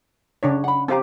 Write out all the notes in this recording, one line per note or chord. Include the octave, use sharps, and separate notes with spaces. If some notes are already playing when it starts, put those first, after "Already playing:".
C#3 D4 C#5
F#5 B5
C4 G4 A4 F5 A#5